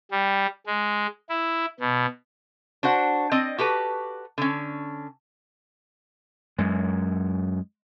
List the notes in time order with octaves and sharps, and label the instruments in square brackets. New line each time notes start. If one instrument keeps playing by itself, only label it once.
[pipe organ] G3
G#3
E4
B2
[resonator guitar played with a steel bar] D4 F#4 C5 F#5
C4 D5 D#5
F#4 G4 A4 B4
D3 C#4
[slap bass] F#2 G#3